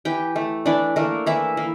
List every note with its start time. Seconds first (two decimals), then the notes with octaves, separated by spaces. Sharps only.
0.05 E3 G4 G5
0.36 A3
0.66 E3 D4 D5
0.96 A3 A#3 A#4
1.26 E3 E4 E5
1.57 A#3